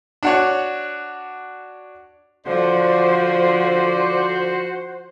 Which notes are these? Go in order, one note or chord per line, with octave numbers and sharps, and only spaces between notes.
D4 F#4 C#5
D3 F3 F#4 C5 D5